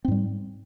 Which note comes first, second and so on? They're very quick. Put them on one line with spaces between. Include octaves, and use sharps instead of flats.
C4 G#2 G3